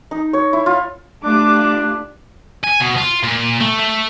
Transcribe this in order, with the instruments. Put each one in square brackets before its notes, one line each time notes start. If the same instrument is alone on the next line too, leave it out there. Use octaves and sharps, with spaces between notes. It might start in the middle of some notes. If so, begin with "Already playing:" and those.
[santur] D#4
C#5
E4
F4
[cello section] A3 F4 G4 [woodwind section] D4 [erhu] D6
[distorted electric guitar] G#5
B2
F4
A#2
A3
A3